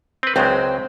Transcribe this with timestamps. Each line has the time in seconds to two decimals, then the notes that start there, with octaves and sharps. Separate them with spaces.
0.23 C4 B4
0.36 C#2 F#3 G#3 C4